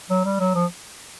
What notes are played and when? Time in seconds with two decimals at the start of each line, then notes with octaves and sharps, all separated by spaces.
0.10 F#3
0.25 G3
0.40 F#3
0.55 F3